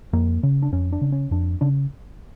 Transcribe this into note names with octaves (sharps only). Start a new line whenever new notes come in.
F2 A#3
C#3
D4
F2 C#4
D4
C#3
C#4
F2 D4
C#3 D4